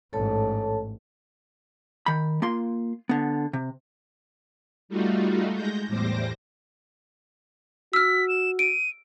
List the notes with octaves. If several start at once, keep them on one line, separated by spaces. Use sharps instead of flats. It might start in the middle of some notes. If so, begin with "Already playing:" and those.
A1 G#2 A4 C#5 A5
D#3 B5
A#3 F4 C6
D3 B3
C3
G3 A3 D#4 F4 F#4
G#3 G6 A#6
E2 A2 G3 C5 D6 A#6
F#4 E6 F6 B6
E7
D7 D#7